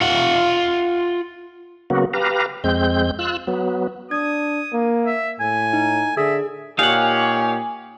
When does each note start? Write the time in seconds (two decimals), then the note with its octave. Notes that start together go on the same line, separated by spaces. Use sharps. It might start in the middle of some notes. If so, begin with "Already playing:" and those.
0.01 F4 F#5
1.90 C#3 F#3 A#3 B3 F#4
2.13 G4 B4 F5 A#5
2.64 F2 G#3 C4 G6
3.19 F4 E6 F#6
3.47 F#3 B3
4.11 D4 D#6 G#6
4.73 A#3
5.06 E5
5.40 A2 G#5
5.73 D#4
6.17 D3 G#4 E5
6.79 A#2 D#4 G4 C#5 F5 F#5 G#5